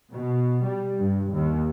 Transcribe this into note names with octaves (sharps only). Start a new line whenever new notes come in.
B2
G3
G2
D#2